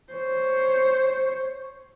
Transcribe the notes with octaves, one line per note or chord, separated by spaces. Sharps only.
C5 C#5